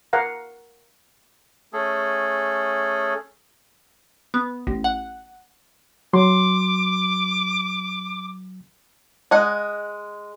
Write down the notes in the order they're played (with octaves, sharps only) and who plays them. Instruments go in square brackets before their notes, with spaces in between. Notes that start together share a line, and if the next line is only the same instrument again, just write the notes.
[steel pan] A#4 F5 F#5 A#5
[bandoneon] A3 C#4 G#4 A4
[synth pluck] B3
A1
F#5
[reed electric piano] F#3 C6 [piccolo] D6
[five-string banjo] G#3 D#5 F#5